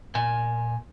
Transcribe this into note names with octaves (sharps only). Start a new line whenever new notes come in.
A#2 G#5